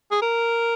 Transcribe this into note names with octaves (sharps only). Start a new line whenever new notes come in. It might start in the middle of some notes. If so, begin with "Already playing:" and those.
G#4
A#4